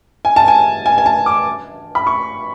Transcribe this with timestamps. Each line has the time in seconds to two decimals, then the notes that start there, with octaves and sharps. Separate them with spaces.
0.25 G#5
0.36 A5
0.48 G#5
0.86 G#5
0.98 G#5
1.06 A5
1.26 D6
1.95 B5
2.07 C#6